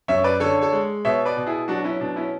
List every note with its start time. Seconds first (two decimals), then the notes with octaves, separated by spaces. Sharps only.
0.08 F#2 C#5 E5
0.24 B4 D5
0.40 D3 A4 C#5
0.61 A4 C#5
0.73 G#3
1.05 B2 C#5 E5
1.25 B4 D5
1.37 B2
1.47 E4 G#4
1.68 F#3 D4 F#4
1.84 C#4 E4
2.00 B2 D4
2.16 C#4 E4